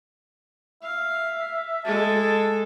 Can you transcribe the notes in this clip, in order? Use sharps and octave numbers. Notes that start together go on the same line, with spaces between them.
E5 F5
G#3 A4 A5